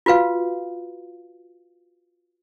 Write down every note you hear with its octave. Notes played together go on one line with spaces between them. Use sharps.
F4 F#4 B4 F5